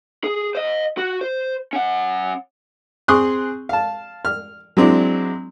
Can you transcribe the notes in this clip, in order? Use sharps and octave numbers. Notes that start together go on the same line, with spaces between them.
G#4
C5 D#5
F#4
C5
C#4 F#5
C4 G#4 C6 C#6 D#6 F#6
F5 A5
F6
F#3 G#3 C4 D4 E4